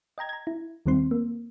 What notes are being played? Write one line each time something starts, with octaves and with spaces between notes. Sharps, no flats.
D#5 G5 A#5 G#6
A#5 G#6
E4
D#2 D#3 G3 C4 C6
A#3